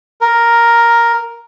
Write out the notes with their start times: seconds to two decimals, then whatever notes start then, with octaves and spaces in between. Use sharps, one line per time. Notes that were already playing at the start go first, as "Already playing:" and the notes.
0.21 A#4